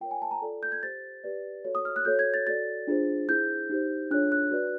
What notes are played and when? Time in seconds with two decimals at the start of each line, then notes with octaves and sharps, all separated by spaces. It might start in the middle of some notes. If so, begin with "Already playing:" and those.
0.01 F4 A#4 C#5 G5
0.11 G#5
0.22 A5
0.31 A#5
0.42 F4 A4 D5
0.63 G6
0.72 G#6
0.83 G4 C5 A6
1.24 G4 B4 D5
1.65 F#4 A4 C#5
1.75 D#6
1.85 F6
1.96 F#6
2.05 F#4 A4 C#5 G6
2.19 G#6
2.34 A6
2.47 F#4 A4 D5 A6
2.87 D4 F4 G#4 C5
3.28 E4 G#4 C5 G6
3.70 D#4 G4 C5
4.11 D4 F4 G#4 C#5 F#6
4.32 F#6
4.51 F#4 B4 D5